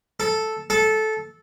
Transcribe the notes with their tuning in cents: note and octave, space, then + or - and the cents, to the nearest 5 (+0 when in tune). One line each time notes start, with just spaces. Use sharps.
A4 -5
A4 -15